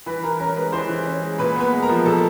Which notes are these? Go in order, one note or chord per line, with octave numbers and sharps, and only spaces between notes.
E3 B4 B5
E3 A#4 A#5
C#4 A#4 A#5
G#3 B4 B5
E3 C5 C6
E3
C#4
G#3
A#2 B4 B5
B3 B4 B5
G#3
A#4 A#5
F3
A#2 A4 A5